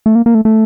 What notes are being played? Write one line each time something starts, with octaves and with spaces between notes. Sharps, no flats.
A3
A#3
A#3
A3
A3